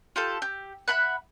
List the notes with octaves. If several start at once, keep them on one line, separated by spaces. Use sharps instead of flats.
F4 G4 A4
G4
E5 F#5 B5 F#6